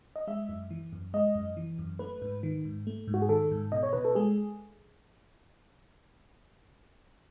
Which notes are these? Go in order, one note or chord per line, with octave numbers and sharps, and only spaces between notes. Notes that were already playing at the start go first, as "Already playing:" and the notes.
D#5
G#3 E5
F#2
E3
F#2
G#3 D#5
F#2
E3
F#2
A3 B4
G#2
D#3
G#2
A3
G#2
F#4
G#4
D#3 A4
G#2
B2 D#5
C#5
B2 B4
A4
G#3 G#4